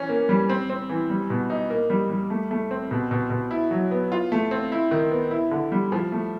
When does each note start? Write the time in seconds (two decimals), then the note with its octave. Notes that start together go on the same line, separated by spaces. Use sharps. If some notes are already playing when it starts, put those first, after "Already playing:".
Already playing: E3 C#4
0.09 A#3
0.29 G3
0.50 C4
0.70 C4
0.89 E3
1.10 G3
1.30 B2
1.50 D#4
1.70 A#3
1.90 G3
2.10 G3
2.30 A3
2.51 A3
2.71 C4
2.91 B2
3.11 B2
3.30 B2
3.51 E4
3.71 F#3
3.91 B3
4.12 F4
4.32 A3
4.51 C4
4.72 E4
4.91 D#3
5.11 B3
5.31 E4
5.51 D3
5.72 G3
5.92 F3
6.12 A3